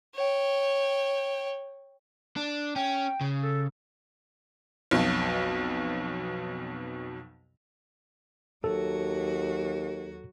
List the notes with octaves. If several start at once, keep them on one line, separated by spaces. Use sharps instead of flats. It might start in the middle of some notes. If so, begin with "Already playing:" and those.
C#5 G5
D4
C#4 G5
C#3
A4
B1 F2 B2 F#3
D#2 F#3 F#4 A4